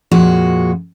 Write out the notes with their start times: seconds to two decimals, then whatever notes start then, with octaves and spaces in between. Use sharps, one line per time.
0.11 F2 A#2 G#3 F#4